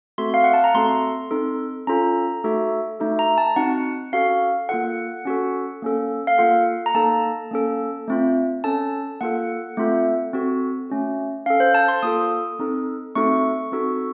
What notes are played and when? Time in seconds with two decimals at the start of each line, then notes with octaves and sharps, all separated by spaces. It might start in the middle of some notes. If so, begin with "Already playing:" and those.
0.18 A3 C4 F#4 A4 C6
0.34 F5
0.44 F#5
0.54 A5
0.64 A#5
0.74 A3 C4 F#4 A4 C6
1.31 C4 D#4 A4
1.87 C#4 F4 A4 A#5
2.44 A3 D#4 F#4 A4
3.00 A3 D#4 F#4 A4
3.19 A#5
3.38 A5
3.56 C4 D#4 F#4 F#5
4.13 C#4 F#4 A4 F5
4.69 A#3 F4 A4 F#5
5.25 C#4 F#4 A4
5.82 A#3 C#4 A4
6.27 F5
6.38 A#3 F4 A4 F#5
6.86 A#5
6.95 A#3 D#4 A4 A5
7.51 A#3 C#4 A4
8.08 A3 C4 F4
8.64 C#4 A4 A5
9.21 A#3 F4 A4 F#5
9.77 A3 C4 F4 A4
10.33 C4 F#4 A4
10.90 A3 C#4 F#4
11.46 C#4 A4 F5
11.60 C5
11.75 A5
11.88 C6
12.03 A#3 F4 A4 D#6
12.59 C4 D#4 A4
13.15 A3 C4 D#4 F#4 A4 C#6
13.72 C4 D#4 F#4 A4